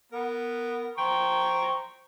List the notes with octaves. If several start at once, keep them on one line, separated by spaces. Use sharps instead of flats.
B3 A#4
C5 G5 A#5 C#6